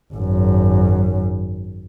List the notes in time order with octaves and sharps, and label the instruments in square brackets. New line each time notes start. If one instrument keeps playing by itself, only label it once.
[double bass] G#1 F#2